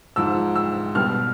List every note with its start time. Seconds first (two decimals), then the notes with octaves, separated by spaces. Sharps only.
0.16 G#2 F3 E6
0.55 E6
0.95 B2 G3 F6